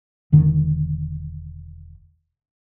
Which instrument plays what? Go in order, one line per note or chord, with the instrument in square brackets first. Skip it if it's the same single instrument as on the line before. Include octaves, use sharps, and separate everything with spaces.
[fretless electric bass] E1 D3 D#3